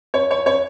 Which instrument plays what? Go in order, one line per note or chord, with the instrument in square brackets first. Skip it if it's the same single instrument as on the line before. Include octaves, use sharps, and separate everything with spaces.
[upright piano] C#5
C#5
C#5